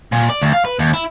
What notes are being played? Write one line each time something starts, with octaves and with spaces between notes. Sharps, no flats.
A#2
D5
D2
F5
B4
D#2
E4